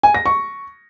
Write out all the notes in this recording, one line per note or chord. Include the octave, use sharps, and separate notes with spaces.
G#5
A#6
C#6